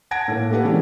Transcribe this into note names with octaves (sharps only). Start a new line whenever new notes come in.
F#5 A5 G#6 A#6 D7
A2 A#3
A3 A#3 G4 B4 F#5
C3 E3 G#3 C#4 D4 G#4